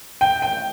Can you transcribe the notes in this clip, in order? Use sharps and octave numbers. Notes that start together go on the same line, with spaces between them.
G5
G5